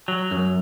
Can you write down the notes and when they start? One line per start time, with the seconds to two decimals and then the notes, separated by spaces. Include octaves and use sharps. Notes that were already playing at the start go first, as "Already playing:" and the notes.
0.08 F#3
0.31 F#2